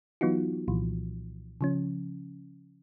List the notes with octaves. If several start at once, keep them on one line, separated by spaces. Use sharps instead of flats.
E3 F#3 B3 D#4 F4 F#4
C2 A#2 E3 F3
C#3 F3 C#4